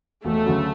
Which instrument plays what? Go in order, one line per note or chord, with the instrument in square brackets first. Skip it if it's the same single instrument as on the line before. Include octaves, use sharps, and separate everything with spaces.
[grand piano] E1 [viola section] A3
[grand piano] D2 C#3 F#3